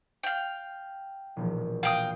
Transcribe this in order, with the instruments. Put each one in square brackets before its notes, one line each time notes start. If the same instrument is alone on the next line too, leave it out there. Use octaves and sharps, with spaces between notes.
[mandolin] F5 G5
[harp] E1 A#1
[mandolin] F5 G5 D#6 [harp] A#6